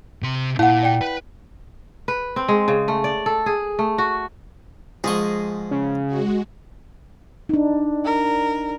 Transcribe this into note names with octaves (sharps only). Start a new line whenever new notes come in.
C3 C6
A#2 E4 F5 F#5
D5 G5
B4
B4
C4
G#3
C#3
A3
D5
A4
G#4
A3
F#4
G#2 F3 G#4 D#5 C#6
C#3
G#3 F#4
D4 D#4
A#4